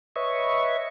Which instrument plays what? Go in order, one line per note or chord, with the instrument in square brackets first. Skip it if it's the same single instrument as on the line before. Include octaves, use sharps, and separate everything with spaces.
[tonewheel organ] B4 C#5 D#5 E5 C#6